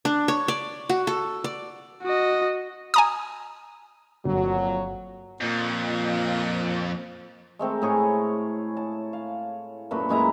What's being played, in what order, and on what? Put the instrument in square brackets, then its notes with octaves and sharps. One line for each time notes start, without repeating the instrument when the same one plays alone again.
[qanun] D4
C#5
D5
F#4
A4
D5
[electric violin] F#4 D#5
[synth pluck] G#5 A#5 D#6
[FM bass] G1 [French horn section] F2 A#2 F#3
[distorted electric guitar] F2 [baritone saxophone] A#2
[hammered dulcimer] G#3 A3 C4 A#4
A2 G#4 C#5
A5
F5
F#2 A#2 A3 B4
F#2 G#3 E4 A#5